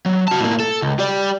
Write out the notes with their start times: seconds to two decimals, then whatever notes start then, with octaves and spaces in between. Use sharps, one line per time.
0.06 F#3
0.28 F#4 A5
0.40 A2 A#3
0.60 A4
0.82 C#2
0.99 G4 D5